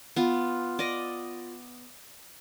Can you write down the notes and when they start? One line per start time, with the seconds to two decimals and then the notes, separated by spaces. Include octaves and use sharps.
0.16 B3 F4
0.79 D5 D#5